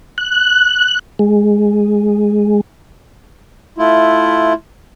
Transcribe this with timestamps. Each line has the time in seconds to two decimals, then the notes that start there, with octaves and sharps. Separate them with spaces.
0.18 F#6
1.19 G#3
3.78 A3 E4 F4